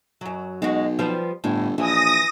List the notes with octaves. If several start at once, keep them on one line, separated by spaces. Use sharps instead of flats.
F#2 F#3
B1 G#3 F#4
F3 G3 B3
G1 A2
A#1 E3 D#6 A#6